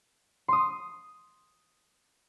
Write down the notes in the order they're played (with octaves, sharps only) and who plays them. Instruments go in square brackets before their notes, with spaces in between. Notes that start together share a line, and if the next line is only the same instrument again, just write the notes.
[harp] C6 D#6